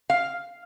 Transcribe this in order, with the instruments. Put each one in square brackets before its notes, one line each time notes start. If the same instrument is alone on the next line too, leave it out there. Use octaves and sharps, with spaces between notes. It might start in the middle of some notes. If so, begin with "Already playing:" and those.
[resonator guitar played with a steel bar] F5